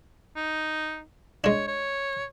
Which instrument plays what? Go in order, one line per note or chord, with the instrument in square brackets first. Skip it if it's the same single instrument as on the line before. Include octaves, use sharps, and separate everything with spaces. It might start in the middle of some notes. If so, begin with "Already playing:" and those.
[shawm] D#4
[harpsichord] G#3 D4 [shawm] C#5
[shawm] C#5